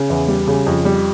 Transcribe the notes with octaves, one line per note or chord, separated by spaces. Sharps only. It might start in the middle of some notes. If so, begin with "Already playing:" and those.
Already playing: C#3
E2
G3
C#3
F2
G3